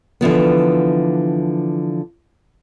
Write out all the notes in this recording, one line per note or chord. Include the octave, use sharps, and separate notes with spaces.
D3 E3 F3 B3